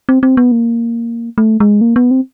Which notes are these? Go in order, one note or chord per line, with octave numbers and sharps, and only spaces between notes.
C4
C4
B3
A#3
A3
G#3
A#3
B3
C4